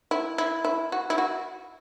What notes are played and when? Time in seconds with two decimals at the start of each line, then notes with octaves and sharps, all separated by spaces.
0.11 E4
0.38 E4
0.65 E4
0.92 F#4
1.10 E4
1.18 F#4